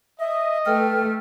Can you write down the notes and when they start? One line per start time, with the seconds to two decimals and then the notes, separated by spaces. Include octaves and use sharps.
0.20 D#5 E5
0.66 A3 A4 B4 G5 F6